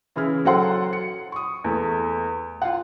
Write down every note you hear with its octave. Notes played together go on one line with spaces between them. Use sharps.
C#3 E3 E4 G#4 F6
F#3 A4 C5 F#5 C6
C#7
C#6 D#6
E2 A3
F4 F5 F#5